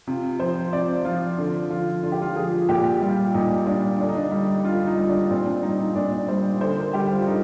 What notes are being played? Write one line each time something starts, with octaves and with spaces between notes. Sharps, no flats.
C3 F4
F3 C5
C3 D5
F3 F4
D3
F3 F4
D3 F4
G4
F4
F3 G#4
A#2 G4
G3 F4
A#2 D#4
G3 D4
D3 D4
D#4
D4
G3
D#4
D3 F4
D#4
G3
D4
A#2 C4
D4
G3 D#4
D#4
A#2 D4
G3 C5
D3 C5
A#4
G3 G4
F4
D3 D#4